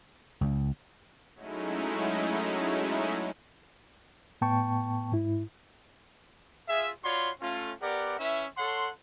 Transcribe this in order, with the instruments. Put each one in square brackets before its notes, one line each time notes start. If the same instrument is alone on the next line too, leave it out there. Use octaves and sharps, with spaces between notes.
[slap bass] C#2
[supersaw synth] F#3 G#3 A3 C#4 D#4 E4
[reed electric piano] A2 B3 G5 A5 C#6
G#2 E4
[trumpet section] F4 G#4 E5
F4 F#4 C#5 D5 B5 C6
A3 C#4 F4
B3 G4 A#4 D5 F#5
C#4 E4 B4 E5
A4 C#5 F#5 C6